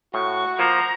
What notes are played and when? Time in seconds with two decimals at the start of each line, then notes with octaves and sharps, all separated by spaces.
0.14 A2 F#4 C#6
0.59 F3 A#3 C5 A#5